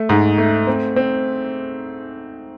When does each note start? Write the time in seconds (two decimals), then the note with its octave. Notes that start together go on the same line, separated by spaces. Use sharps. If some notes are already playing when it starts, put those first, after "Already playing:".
Already playing: A3
0.09 G#2
0.38 A3
0.67 C4
0.96 C4